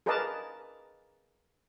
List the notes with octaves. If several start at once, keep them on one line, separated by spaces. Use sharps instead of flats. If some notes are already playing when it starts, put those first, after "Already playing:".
G#4 A#4 B4 D5 D#5 A5